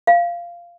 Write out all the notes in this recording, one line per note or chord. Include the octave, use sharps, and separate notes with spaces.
F5